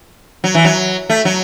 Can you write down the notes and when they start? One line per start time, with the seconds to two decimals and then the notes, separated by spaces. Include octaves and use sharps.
0.44 F#3
0.55 E3
0.65 F#3
1.10 A3
1.25 F#3